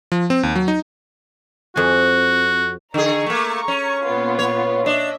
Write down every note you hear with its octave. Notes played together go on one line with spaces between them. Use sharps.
F3
C4
D#2
F#3
D#4
F2 F#4 G#5
D3 G#4 A#5 C#6
A3 A#3
C#4
A#2 B3 F4
C#5
D4 D#5 E5